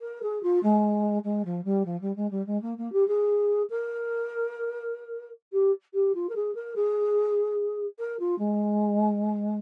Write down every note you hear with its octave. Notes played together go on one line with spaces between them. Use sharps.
A#4
G#4
F4
G#3
G#3
F3
G3
F3
G3
G#3
G3
G#3
A#3
A#3
G4
G#4
A#4
G4
G4
F4
A#4
G#4
A#4
G#4
A#4
F4
G#3